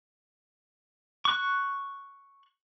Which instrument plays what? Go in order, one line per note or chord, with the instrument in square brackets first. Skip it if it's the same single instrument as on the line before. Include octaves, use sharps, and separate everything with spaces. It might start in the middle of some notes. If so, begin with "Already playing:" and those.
[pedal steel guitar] C#6 F#6